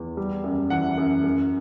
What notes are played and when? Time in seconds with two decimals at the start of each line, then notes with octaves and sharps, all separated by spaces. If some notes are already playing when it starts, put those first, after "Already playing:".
Already playing: E2
0.17 G3
0.44 F#2
0.70 E3 F#5
0.97 F#2
1.24 F#2